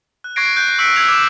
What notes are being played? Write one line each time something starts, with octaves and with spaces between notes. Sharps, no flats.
F#6
C#6 F#6 G#6 A#6 C7 D7
F#6 G6
C#6 E6 F#6 B6 C#7 D7
E6 F#6 G#6 F7
D6